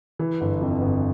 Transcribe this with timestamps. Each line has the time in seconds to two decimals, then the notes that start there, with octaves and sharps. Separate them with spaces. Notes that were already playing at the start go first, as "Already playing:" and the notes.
0.19 E3
0.41 G1
0.61 F2
0.82 G1